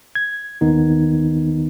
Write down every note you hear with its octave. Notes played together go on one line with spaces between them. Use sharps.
G#6
D#2 D#3 B3 D#4